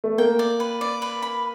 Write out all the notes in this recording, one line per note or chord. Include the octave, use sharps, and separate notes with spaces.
A3
A#3 G5
D5
B4
D5
B4
B5